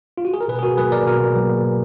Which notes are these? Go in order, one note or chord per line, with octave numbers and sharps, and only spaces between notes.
F4
F#4
G#4
A#4
B2 G#4 B4
G#4
F#4 A#4
F#3 A#3 G#4 B4
A#4 D5
B2 F#4 A#4
F#3 A#3
B2